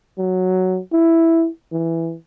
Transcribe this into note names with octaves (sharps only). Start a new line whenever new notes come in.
F#3
E4
E3